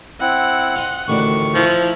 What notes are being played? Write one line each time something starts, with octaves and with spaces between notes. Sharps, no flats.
C4 E4 F#5
F4 D#5
A1 D2 A2 D#3 D5 C#6
F3 E4 D#5 G#5 A#5